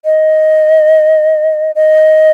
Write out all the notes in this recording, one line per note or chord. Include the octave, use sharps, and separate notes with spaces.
D#5
D#5